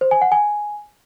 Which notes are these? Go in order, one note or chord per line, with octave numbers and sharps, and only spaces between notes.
C5
G#5
F#5
G#5